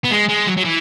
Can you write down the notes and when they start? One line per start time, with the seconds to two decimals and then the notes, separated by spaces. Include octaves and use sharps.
0.05 B3
0.11 G#3
0.29 G#3
0.47 F#3
0.57 F#3
0.65 E3